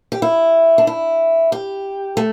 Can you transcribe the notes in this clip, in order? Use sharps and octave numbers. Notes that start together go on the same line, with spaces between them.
G4
E4
D4
E4
G4
A3